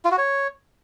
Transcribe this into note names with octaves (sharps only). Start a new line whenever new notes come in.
F4
F#4
C#5